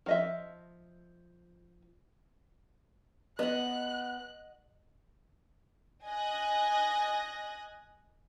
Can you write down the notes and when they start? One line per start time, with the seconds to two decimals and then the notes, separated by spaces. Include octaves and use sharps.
0.06 F3 D#5 E5
3.39 B3 D#5 F#5 F#6
6.05 D#5 G#5 D#6 F#6 A#6